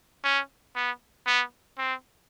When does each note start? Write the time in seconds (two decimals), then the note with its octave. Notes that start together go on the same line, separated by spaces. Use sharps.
0.24 C#4
0.75 B3
1.27 B3
1.78 C4